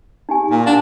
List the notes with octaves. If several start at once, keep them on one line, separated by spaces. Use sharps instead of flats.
D#4 G4 G#5
A#2
D4 F5 F#5 A5